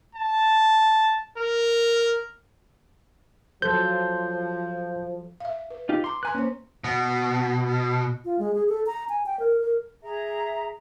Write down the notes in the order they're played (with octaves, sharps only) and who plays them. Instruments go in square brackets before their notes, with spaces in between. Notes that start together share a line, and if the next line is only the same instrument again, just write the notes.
[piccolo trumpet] A5
A#4
[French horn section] F3 [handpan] F#3 A4 C5 [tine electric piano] G6
[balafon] E5 F5
B4
[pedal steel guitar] D#4 F4 G4
[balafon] A#5 D6 [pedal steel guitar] C6
[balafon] B4 A#5 C6 [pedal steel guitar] G#5 F#6
[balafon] A#3 C5 [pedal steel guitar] C#4
[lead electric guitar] B2
[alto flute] F4
G#3
G#4
A4
A#5
G#5
G5
A#4
A#4
[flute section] G#4 E5 A#5